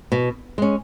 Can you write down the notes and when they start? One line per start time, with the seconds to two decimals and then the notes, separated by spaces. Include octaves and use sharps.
0.12 B2
0.58 G#3 C#4